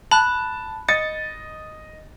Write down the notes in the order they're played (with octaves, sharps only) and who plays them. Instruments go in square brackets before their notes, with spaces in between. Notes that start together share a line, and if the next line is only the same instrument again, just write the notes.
[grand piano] A5 [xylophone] B5 F#6
[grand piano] D#5 A6 [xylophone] C#7